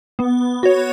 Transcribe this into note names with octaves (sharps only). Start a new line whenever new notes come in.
B3
F#4 C#5